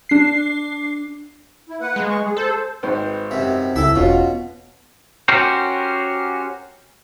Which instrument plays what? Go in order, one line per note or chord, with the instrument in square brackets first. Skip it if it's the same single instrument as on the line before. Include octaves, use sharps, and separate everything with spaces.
[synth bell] D4 C7
[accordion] E4
A#3 B4 F#5
[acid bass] G#3
[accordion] C#6
G#4
[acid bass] A4 [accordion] C5
[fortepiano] G#1 B4 C5
[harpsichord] F#2 C3
[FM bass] C#2 [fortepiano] E4 [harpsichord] A4 E5
[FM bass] E1 [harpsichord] B2 [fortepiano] C#4 F4 F#4
[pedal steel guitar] C#4 F#4 G4 A#4 C5